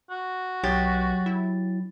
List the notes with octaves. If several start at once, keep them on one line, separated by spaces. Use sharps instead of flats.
F#4
B1 F#3 G4 A6
E4